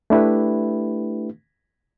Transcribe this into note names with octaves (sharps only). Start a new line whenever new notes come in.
A3 D4 E4 G4 B4